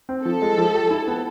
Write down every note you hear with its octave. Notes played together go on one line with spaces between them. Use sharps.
C4
F3 A4
G#3
F3
G4
E4
B3